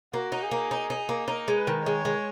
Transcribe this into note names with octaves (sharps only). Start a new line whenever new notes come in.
A#3 F#4
D#4
G#4
A#3
D#4
D#4
A#3
D#4 A#4
G#3
B4
D#3
G#3 C#5
G#3